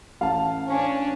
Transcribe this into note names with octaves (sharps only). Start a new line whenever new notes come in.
A1 F5 A5
C#4 D4